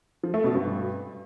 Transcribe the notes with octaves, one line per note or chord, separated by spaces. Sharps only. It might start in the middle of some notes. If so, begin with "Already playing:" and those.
F3
A3
B2
G2